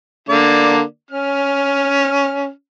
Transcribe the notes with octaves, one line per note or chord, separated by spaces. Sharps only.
D3 A#3 D5
C#4 F6